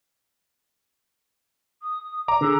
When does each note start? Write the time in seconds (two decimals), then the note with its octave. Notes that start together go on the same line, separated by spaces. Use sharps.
1.82 D#6
2.28 D5 A#5 D6
2.41 D3 G#4